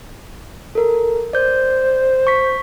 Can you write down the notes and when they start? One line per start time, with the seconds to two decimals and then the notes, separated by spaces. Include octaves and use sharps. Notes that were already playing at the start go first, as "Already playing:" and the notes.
0.75 A4 A#4
1.33 C5 D5 G6
2.27 C#6 B6